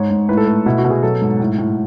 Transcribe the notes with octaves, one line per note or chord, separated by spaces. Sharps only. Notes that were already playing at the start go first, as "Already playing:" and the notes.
Already playing: G#2 C#5
G#2
A2 B4
A4
A3 B4
B2 E4
F#4
B2
G#4
F#3 A4
G#2
A2
A2